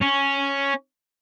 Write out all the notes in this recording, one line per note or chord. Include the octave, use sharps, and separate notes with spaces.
C#4